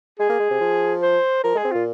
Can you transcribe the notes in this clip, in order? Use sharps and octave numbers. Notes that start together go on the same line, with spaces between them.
G#3 G#4
A#3
G#3
C3
F3
C5
F3 A#4
G#3
G#4
C4
A#2 F4